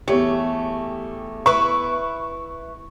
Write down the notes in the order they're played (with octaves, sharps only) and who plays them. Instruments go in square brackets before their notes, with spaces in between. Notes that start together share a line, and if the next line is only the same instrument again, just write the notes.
[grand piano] E2 C#5 C#7 [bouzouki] A3 [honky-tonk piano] G4
[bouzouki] E4 B4 [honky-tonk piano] C#6